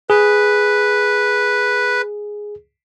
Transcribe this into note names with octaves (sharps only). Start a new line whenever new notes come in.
G#4 B4